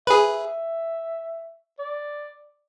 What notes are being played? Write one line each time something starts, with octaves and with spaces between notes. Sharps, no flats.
G#4 B4 E5
D5